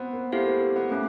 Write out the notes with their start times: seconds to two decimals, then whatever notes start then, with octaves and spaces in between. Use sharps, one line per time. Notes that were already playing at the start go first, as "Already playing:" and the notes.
Already playing: B3 C4
0.13 A#3
0.32 A3 E4 G4 C5 F5
0.46 A#3
0.61 A#3
0.76 B3
0.90 A3 A#3 C#4